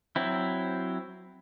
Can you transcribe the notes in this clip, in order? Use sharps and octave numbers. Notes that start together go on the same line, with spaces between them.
F#3 C4 E4